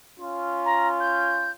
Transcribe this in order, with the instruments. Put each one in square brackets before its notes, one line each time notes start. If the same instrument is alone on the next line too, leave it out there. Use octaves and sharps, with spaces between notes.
[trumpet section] C#4 F4
[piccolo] A#5
G6